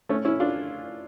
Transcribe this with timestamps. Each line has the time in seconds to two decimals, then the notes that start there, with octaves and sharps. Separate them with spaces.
0.09 A3 C#4
0.25 C#4 E4
0.40 D4 F4